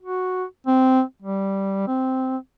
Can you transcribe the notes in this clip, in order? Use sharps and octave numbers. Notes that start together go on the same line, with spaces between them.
F#4
C4
G3
C4